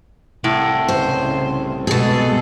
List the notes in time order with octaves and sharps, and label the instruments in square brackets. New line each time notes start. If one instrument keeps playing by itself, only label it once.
[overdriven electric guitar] C2 [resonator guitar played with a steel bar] A2
[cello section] C#3 [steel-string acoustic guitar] C5
[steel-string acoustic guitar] B2 G#4 [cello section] G#3 A4